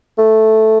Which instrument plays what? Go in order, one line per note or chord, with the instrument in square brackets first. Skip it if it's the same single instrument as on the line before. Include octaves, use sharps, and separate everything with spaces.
[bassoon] A3